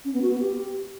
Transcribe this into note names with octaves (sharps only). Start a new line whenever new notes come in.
C#4
B3
F#4
B3
G4